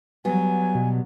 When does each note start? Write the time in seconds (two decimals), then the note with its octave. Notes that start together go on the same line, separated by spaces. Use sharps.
0.25 F#3 G3 B3 G#5
0.75 B2